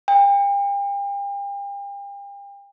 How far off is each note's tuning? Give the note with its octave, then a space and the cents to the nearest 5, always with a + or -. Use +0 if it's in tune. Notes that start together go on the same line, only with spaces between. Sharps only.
G5 +40